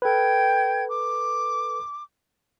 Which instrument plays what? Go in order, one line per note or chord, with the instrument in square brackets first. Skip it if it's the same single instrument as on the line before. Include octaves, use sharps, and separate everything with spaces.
[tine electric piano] A4 B4 [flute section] G5 G#6
[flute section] D6